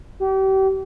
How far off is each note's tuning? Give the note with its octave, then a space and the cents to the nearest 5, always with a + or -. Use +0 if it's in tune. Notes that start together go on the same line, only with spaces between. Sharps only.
G4 -35